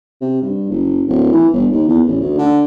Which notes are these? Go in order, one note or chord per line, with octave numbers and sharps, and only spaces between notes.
C3
G2
F#1
D1
E3
G1
D#2
E2
A1
D2
D3